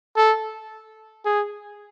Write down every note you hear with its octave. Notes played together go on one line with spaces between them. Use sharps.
A4
G#4